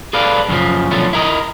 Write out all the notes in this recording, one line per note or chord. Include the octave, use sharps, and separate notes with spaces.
G#4 A4 B4 D5 F5
F#2 C#3 F3
B2 D3 F3 F#3 A3
E4 A#4 D#5